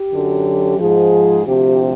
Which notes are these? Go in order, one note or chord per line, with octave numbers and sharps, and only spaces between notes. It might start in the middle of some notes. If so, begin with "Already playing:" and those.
Already playing: G4
F#2 D3 F#3
G#2 F3 G#4
D2 C3 F3 G4